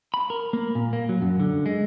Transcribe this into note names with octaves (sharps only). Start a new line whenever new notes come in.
B5
A#4
A#3
A#2
A#3
F#3
F#2
D3
G#3